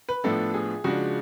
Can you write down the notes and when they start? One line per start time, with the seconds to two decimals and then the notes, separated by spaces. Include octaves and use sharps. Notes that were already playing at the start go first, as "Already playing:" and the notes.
0.09 B4
0.24 A2 F3 B3 D4 A4
0.54 G#4
0.84 C#3 F3 G#3 D4 F#4